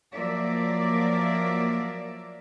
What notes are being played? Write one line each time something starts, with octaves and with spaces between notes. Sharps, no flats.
F3 F#3 A#3 A#4 D5 E5